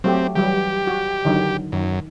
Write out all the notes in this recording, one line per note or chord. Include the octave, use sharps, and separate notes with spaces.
F#3 A3 C4 G4
E3 F#3 G3 G4
F#4
D3 D#3 F#3
F#2 D#3